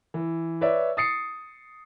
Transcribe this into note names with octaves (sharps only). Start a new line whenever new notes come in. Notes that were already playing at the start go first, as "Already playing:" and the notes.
E3
B4 C#5 D5 E5
D#6 A6 C7 C#7